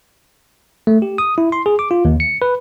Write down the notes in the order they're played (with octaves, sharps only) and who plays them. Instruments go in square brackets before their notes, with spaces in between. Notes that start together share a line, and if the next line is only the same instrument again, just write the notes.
[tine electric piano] A3
G4
D#6
E4
C6
G#4
D6
F4
D#2
C#7
B4